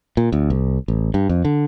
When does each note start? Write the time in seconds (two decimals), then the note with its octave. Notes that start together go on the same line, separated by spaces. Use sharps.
0.17 A#2
0.32 D2
0.50 C2
0.88 A1
1.14 G2
1.29 F2
1.45 D3